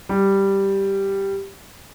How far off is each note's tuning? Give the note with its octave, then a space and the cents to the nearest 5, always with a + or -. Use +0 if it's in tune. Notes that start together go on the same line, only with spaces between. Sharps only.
G3 +0